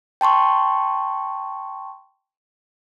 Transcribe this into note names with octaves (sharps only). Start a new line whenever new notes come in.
G5 A5 C6 C#6